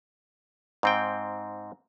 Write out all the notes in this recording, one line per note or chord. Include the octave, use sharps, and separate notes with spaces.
G#2 C4 G5